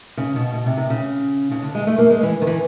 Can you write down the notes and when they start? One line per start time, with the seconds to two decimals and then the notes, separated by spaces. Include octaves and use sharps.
0.17 C#3
0.36 B2
0.53 B2
0.66 C3
0.77 C3
0.90 C#3
1.51 C#3
1.62 D3
1.75 G#3
1.87 A3
1.98 A#3
2.11 G#3
2.23 E3
2.41 D#3
2.47 E3